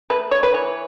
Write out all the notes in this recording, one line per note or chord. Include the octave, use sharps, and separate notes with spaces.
A3 B4
C#5
B4
E3 C#5